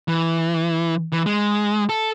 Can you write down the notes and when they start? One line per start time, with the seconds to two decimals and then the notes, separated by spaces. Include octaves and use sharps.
0.08 E3
1.12 E3
1.26 G#3
1.89 A4